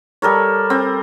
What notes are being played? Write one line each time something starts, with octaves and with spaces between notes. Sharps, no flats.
G3 A4 A#4 C#5
C4